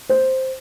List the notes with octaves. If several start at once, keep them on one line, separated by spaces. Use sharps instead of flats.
C5